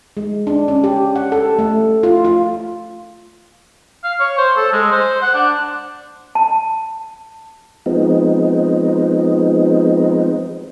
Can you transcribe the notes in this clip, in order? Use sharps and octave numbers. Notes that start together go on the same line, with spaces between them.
G#3
D4
C#4
G4
F#5
A4
A3
F4
F4
F5
C#5
C5
A4
G#3
C5
F#5
D4
A5
F3 G#3 B3 C4 D#4